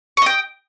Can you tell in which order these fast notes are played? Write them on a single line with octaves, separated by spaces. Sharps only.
C#6 D#5 G5